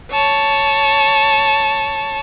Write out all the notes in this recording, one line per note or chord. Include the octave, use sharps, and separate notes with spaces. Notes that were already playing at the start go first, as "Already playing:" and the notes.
C#5 A5